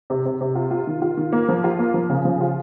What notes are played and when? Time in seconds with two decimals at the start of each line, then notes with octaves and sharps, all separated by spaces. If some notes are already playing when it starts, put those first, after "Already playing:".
0.10 C3
0.26 C3
0.41 C3
0.55 F4
0.71 F4
0.87 D#3
1.02 F4
1.17 D#3
1.32 A#3
1.49 F3
1.64 F4
1.79 A#3
1.94 F3
2.09 C#3
2.25 F3
2.41 F4